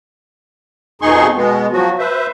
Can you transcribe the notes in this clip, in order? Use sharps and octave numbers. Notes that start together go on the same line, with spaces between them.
F2 B2 D#4 G#4 C6 C#6
B2 G#3 B3
F3 F#3 F#4
B4 C5 E5